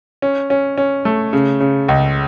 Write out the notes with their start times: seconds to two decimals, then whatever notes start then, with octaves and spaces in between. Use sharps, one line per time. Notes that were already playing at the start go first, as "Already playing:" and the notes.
0.22 C#4
0.50 C#4
0.78 C#4
1.05 A3
1.33 C#3
1.60 C#3
1.88 C#2